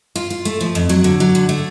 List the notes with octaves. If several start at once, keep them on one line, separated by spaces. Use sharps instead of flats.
F4
F4
A3
F3
F2
F#3
D3
F#3
D3
A3